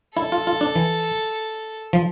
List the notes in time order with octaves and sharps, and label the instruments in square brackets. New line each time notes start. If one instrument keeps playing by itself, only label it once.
[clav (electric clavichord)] E4 [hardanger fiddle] A4
[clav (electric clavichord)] F4
F4
D4
E3
F3